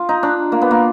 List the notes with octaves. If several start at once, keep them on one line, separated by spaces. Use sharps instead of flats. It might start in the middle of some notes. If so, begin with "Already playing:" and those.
Already playing: F4
D#4
D4
A#3
B3
A#3